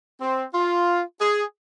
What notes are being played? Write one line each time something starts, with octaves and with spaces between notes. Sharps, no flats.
C4
F4
G#4